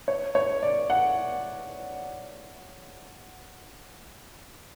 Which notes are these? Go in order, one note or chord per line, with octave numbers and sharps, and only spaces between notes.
C#5
C#5
D5
F#5